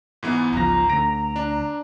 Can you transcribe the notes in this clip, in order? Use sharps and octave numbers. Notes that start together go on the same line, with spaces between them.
G#2 E3 B3
G1 C#2 G#2 F3 A#5 A#6
D2 D3 A#6 D7
D4